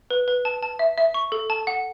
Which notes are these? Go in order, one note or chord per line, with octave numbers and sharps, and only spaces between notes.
B4
B4
A5
A5
E5
E5
C#6
A4
A5
F#5